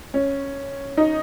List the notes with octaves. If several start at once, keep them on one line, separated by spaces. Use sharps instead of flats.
C#4
D#4